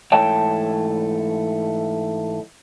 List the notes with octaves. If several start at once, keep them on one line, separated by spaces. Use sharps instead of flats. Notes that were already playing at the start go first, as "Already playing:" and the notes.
G#2 E3 A3 C#5 G5 A5